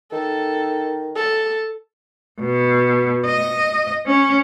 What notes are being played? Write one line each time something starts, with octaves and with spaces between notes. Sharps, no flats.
D#3 A4
A4
B2
D#5
C#4